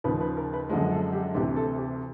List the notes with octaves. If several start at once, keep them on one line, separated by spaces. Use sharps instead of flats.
D#2 C#3 F3 B4
B4
A#4
B4
F#2 D3 F3 G#3
A4
G4
D2 C3 E3 G4
A4
G4